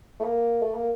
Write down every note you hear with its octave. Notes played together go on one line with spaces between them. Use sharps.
A3
A#3
A3
A#3